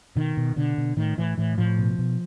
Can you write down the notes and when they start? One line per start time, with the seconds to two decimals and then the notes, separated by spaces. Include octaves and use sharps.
0.16 B2 D#3
0.37 B2
0.56 B2 D3
0.78 B2
0.97 A2 D#3
1.17 A2 E3
1.38 A2 E3
1.58 A2 F3
1.79 B2
1.99 B2